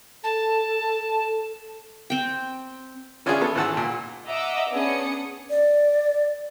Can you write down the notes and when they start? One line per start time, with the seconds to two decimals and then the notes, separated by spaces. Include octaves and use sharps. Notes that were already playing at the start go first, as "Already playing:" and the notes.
0.24 A4 A5
2.10 C4 G5
3.26 E3 C#4 D4 E4 F4 G#4
3.41 B3 A4
3.55 G#1 E3 F#5 A5 E6
3.77 A#2
4.27 D#5 E5 F#5 A#5 D6 E6
4.71 B3 C#4 D4 G#4 D#6 C#7
5.50 D5